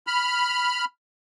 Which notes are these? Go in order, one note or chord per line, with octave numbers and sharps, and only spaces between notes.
B5 F6